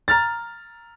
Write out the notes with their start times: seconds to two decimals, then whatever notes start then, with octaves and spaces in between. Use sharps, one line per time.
0.08 A#5 F6 A6